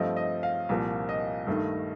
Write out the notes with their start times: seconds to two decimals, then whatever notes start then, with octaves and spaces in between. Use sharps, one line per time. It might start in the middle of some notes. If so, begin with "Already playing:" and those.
Already playing: G2 F3 A3 C4 D#5
0.16 D#5
0.43 F5
0.69 C2 A#2 F3 A#3
1.09 D#5
1.47 G2 D#3 A3